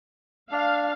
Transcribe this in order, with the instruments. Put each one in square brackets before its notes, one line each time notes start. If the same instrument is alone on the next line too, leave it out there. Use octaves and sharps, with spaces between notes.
[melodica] D4 [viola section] F5